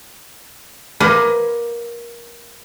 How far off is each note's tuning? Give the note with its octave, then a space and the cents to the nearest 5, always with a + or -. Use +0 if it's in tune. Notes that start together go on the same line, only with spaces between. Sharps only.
A#3 +20 B4 +30 D#5 +0